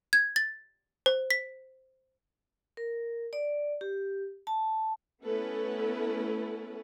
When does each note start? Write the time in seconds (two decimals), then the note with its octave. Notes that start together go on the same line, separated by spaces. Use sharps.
0.13 G#6
0.36 A6
1.06 C5
1.30 B6
2.77 A#4
3.33 D5
3.81 G4
4.47 A5
5.24 A3 B3 C#4 E4 A4 B4